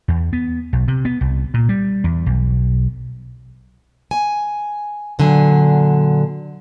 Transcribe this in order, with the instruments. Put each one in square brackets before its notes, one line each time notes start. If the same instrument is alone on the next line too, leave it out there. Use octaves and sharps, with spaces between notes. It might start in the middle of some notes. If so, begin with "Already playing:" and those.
[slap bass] E2
B3
B1
C3
B3
C2
A#2
G3
E2
B1
[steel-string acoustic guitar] G#5
A#2 D3 F#3 G#5